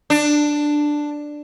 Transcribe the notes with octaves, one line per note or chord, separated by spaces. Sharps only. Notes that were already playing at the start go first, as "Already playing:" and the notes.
D4